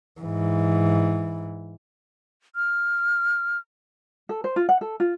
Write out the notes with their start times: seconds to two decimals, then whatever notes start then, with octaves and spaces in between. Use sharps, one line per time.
0.21 G#2 E3
2.56 F6
4.29 A4
4.44 C5
4.56 F4
4.69 F#5
4.81 A4
5.00 F4